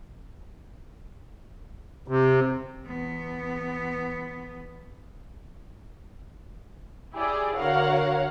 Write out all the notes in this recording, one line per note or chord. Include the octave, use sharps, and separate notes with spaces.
C3
E2 B3
E4 G4 G#4 D5
D3 F#4 A#4 C#5 F5 F#5